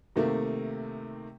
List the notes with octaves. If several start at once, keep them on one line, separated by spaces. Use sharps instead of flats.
C3 D#3 A3 A#3